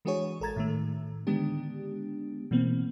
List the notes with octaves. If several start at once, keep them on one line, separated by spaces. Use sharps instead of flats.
E3 G#3 D4 F#4 G#4 C#5
A1 A4 A#4 A#5 G#6 A6
A2 D#3 A3
D3 D#3 G#3 B3 D4 G4
B2 E3 A#3 C4